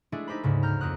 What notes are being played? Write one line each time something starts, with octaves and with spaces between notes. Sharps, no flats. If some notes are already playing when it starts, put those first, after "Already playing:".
G#3 A3 D4 E4 G#4
D#4 G4 C5 B5
D2 G#2 C#3
A#5 F6 G6
F2 A#3 D#6 F#6